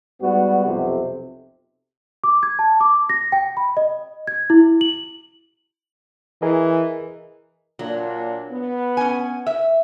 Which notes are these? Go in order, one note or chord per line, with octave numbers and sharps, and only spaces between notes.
G#2 G3 B3 F#4
B1 F2 C3
D6
G#6
A5
D6
A#6
G5
B5
D#5
G#6
E4
F#7
E3 G#4 A#4 D#5
A#2 F#3 D4
B3
C#4 G#5
E5